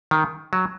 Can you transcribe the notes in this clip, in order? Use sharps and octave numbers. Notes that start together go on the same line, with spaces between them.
D#3
F#3